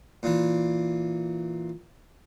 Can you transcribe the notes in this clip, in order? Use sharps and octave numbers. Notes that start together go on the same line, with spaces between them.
A#2 E3